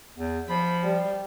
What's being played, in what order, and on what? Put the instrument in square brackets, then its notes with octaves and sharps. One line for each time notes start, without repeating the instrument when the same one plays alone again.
[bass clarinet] E2
[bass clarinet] F3 [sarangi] B5
[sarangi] G3